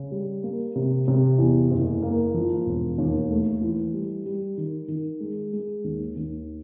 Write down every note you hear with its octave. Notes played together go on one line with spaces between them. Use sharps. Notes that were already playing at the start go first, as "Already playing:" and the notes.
Already playing: C#3
G3
A#3
C3
C3
E2
F#1
A#3
F3
E1
D#2
A3
E3
G3
G3
D#3
D#3
G#3
G#3
D#2
D#2